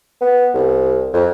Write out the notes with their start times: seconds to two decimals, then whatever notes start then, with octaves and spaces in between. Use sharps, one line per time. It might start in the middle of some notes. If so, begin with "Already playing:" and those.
0.21 B3
0.54 C2
1.14 F2